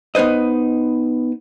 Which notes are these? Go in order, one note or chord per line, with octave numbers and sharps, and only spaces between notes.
B3 D#4 B4 C5 D#5